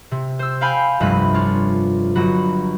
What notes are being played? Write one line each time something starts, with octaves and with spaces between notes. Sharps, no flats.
C3
C5 E6
F5 G5 G#5 B5 G6
F1 C2 G2 B5 F#6 D#7
D4 F4 C#5
G1 F#3 F#4 B5